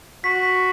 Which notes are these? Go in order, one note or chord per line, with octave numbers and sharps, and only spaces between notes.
F#4 B6
B6